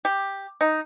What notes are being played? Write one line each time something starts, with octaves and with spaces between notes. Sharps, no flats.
G4
D#4